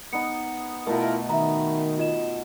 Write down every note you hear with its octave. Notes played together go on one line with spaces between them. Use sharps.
B3 D#4 C#7
B2 A3 E4 F4 A#4
D#3 E5 A#5 B5
F4 D#5 E7